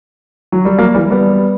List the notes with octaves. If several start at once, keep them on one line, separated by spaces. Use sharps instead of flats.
F#3
G3
F#3 A#3
E3 G3
G3 B3